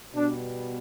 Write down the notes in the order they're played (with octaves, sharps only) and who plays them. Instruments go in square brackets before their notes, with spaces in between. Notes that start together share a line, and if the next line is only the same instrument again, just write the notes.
[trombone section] B2 G3 B3 D4